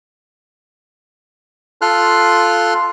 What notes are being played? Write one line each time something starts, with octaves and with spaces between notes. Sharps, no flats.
F4 A4 C6 F6 F#6